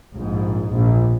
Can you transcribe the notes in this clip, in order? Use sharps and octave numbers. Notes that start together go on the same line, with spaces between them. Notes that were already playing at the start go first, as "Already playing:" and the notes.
A#1 G#2
A#1